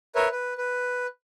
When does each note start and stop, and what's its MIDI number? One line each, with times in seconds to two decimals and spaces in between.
0.15 0.28 70
0.15 0.28 71
0.15 0.28 73
0.15 0.28 76
0.32 0.54 71
0.58 1.07 71